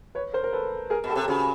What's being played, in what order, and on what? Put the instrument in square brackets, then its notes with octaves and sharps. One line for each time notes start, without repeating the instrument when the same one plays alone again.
[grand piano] B4 C#5
A#4 C5
A#4
A4 B4
G#4 A#4
[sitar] B2
[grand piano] G4 A4
[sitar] C3
[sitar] C#3 [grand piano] F#4 G#4